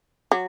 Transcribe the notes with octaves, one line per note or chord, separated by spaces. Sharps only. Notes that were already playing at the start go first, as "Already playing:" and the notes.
F#3